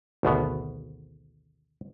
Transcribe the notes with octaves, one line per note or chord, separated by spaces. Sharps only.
G#1 D2 B2 B3